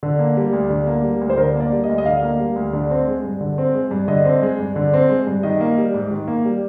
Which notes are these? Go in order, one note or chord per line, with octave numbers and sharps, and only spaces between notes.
D3
A#3
G3
D2
D3
A#3
G3
D2
C5
D3 A#4
A#3
D5
G3
D#5
D2
D#5
D3 F5
A#3
G3
D2
D3
C4
G#3
G2
D3
C4
G#3
G2
D3 D#5
C4
G#3
G2
D3
C4
G#3
G2
D#3 D#5
A#3
G3
G#2
D#3
A#3
G3